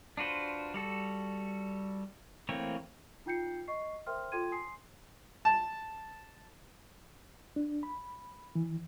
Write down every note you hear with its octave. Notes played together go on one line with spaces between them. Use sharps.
D4 F4 F#4 B4 C5
G3 F#4 A4
E3 A3 A#3 C4 C#5
D#4 F4 G5 G6 C7 C#7
D#5 C#6 C7
A#4 C5 E5 G5 C6 F6
F4 A4 G5 C6 G#6 D#7
G#5 C6 D#6 C7
A5
D4
B5
E3